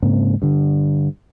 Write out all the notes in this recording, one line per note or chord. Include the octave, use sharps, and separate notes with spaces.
G#2 C#3 A#3 C4
G2 D3